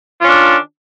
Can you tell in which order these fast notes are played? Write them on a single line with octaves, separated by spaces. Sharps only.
F4 C#4 D4 D#3